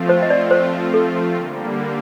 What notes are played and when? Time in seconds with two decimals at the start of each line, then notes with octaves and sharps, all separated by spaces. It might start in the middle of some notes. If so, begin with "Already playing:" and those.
Already playing: F3 A3 C4 F4
0.09 C5
0.23 D#5
0.30 D5
0.51 C5
0.94 A4
1.36 D3 G3 A#3